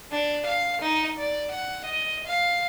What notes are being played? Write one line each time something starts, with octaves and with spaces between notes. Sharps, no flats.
D4
F5
D#4
D5
F#5
D#5
F5